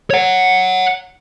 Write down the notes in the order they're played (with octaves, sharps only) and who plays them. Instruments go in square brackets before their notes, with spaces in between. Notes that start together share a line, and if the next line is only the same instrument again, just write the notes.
[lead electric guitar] C#5 F#5